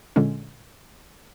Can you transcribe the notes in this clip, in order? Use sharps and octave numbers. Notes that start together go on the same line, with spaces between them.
A#2 D3 G#3 C#4